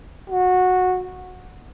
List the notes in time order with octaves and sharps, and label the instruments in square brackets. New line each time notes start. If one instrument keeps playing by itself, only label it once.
[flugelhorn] F#4